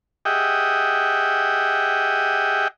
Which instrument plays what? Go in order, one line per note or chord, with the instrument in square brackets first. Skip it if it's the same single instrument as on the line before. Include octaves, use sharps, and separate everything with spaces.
[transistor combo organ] G4 G#4 D#5 E5 F#5 G5